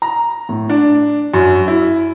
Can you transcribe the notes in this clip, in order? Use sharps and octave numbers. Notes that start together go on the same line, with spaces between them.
A#5
A2
D4
F#2
E4